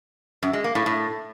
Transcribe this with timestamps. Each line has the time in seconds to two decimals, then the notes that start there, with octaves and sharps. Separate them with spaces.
0.43 F#2
0.53 G#3
0.64 A#3
0.75 A2
0.86 A2